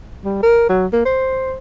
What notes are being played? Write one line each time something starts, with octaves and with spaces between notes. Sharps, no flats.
G3
A#4
F#3
A#3
C5